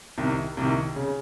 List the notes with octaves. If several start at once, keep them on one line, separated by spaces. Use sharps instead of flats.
C2 C3 D#3
C2 C3 D#3
C#3